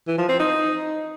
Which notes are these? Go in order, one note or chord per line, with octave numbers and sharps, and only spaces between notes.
E3
F3
C4
D#4